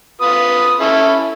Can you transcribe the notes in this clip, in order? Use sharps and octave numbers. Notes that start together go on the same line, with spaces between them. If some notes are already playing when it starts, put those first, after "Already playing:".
F4 B4 D#6
C#4 E4 A4